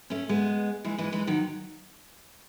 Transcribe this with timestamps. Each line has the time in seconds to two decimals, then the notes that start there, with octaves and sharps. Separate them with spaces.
0.10 A3 C#4
0.29 G#3 B3
0.84 E3 G#3
0.98 E3 G#3
1.12 E3 G#3
1.27 D#3 F#3